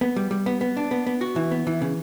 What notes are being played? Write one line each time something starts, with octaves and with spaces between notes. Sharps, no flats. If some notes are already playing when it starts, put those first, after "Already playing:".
B3
G3
G3
B3
B3
D4
B3
B3
F#4
E3
B3
E3
C#3